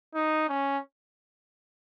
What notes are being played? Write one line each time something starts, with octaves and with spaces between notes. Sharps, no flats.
D#4
C#4